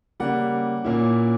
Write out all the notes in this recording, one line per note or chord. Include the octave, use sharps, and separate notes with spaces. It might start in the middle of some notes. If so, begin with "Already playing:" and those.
C#3 G3 A#3 D5 F#5
A#2 A#3 C#4 E4